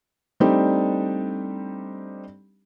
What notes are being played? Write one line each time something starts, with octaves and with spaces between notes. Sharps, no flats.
G3 A3 C4 D4 D#4 G4